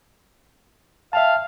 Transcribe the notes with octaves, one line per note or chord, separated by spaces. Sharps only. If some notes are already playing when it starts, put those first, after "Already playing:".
E5 F5 G5 A5